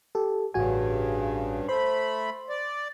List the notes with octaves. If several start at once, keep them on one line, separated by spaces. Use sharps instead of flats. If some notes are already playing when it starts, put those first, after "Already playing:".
G4 A4
A1 G2 C#3 F#4 G#5
A3 C5 B5 C6
D5